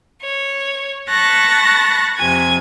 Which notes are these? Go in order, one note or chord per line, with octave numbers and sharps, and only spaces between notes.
C#5
A5 B5 C#6 F#6 A6 A#6
F2 C3 G#5 G#6